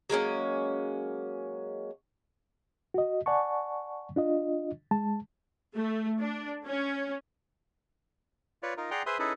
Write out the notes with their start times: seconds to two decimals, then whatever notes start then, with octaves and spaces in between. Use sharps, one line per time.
0.10 F#3 G#3 A#3 C#4
2.94 F#4 D#5
3.26 D5 F#5 G#5 A5 C#6
4.16 D4 F4 D#5
4.91 G#3 A5
5.76 A3
6.20 D4
6.67 C#4
8.63 F4 B4 C#5 D5
8.77 D#4 F4 A#4
8.91 G#4 D5 F#5 G5 A#5 C6
9.06 G#4 B4 C5 E5 C6 D#6
9.19 C#4 D#4 E4 G#4 A4 B4